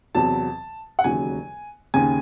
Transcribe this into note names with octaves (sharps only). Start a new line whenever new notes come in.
E2 C3 F#3 A5
F#5
E1 D#2 C#3 F#3 G#5
D#2 C#3 G#5